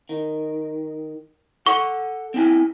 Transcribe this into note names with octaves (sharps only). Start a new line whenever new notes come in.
D#3
A4 F#5 C#6
C4 E4 G#5